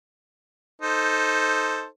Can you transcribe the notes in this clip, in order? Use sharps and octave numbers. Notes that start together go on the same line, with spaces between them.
D#4 A4 C5